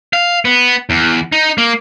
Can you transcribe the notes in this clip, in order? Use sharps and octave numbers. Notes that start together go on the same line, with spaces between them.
F5
B3
E2
D#4
A#3